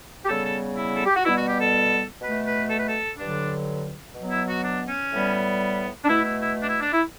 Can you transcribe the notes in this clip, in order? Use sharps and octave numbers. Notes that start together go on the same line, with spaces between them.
G4
C#3 G3 B3 A4
A4
E4
A4
G4
F#4
B2 G3 B3 E4
F#4
G4
A4
B2 A3 B4
B4
A4
B4
A4
G2 D3 F#3 D4
B2 F#3 B3
E4
F#4
D4
C#4
A2 G3 B3
D4
B2 A3 E4
E4
E4
D4
E4
D4
E4